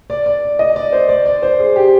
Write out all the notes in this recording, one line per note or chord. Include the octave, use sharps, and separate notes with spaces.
D5
D5
D#5
D5
C5
D5
D5
C5
G#4
G4